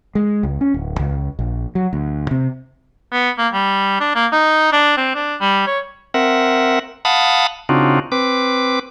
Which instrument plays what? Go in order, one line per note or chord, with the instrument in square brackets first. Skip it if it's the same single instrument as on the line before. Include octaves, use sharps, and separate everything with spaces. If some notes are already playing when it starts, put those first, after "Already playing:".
[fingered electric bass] G#3
C#2
C#4
D1
C#2
A#1
F#3
D2
C3
[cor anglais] B3
A#3
G3
D4
A#3
D#4
D4
C4
D4
G3
C#5
[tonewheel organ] C4 A#4 E5 F#5
F5 F#5 A5 B5 D#6
C#3 C4 D4 D#4 F4 F#4
C4 B4 D6